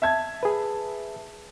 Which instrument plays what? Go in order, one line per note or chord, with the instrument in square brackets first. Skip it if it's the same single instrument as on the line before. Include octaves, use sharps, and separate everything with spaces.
[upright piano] E5 A5 G#6
[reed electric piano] G#4 B4